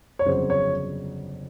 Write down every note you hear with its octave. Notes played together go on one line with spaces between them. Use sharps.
C#5
G1 F2 C#3 F#3 C5
C#5